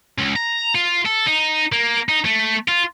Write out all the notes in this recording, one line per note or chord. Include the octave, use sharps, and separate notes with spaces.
C#2
A#5
F4
A4
D#4
A#3
D#4
A3
F4